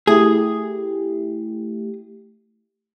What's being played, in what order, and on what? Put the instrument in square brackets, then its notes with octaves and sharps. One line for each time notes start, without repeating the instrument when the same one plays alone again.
[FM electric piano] A3 E4 G4 [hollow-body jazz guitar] G#4